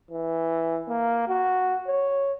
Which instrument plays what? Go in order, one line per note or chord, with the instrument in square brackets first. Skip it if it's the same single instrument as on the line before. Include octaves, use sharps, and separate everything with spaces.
[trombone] E3
A#3
F#4
C#5